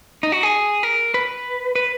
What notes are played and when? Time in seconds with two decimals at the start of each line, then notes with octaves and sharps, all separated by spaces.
0.23 D#4
0.32 F#4
0.43 G#4
0.83 A#4
1.14 B4
1.75 B4